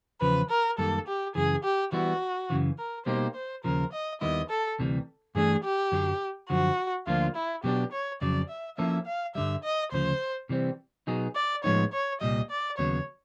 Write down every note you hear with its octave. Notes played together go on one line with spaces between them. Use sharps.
E2 C#3 F3 B4
A#4
F#2 D#3 G3 A#3 A4
G4
F#2 C#3 E3 G#4
G4
E3 G3 B3 E4 F#4
F#2 C#3 E3
A#4
B2 G3 A#3 D#4 G4 C5
C5
D#2 C#3 F3 A#4
D#5
D#2 D#3 G3 B3 E4 D#5
A4
D2 C3 E3 G3
G2 E3 A3 D4 G#4
G4
F#2 D3 F#3
F#2 D3 F3 F#4
D2 D3 F3 A#3 D4 F4
E4
B2 F#3 B3 D4 G4
C#5
F2 C#3 F#3 D5
E5
F3 A#3 C#4 E4 A4 E5
F5
G2 D3 G3 E5
D#5
D2 C#3 F3 C5
C3 E3 G3 C4
B2 F#3 B3 D#4 G#4
D5
A2 F3 G#3 B3 D#4 C#5
C#5
C2 A#2 G3 D#5
D5
D#2 C#3 F#3 B3 C#5